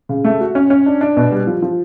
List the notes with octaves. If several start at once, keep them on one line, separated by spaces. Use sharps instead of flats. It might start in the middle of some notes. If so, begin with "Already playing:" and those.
C#3
A3
F#4
C#4
C#4
D4
D4
B2
G3
F3
F3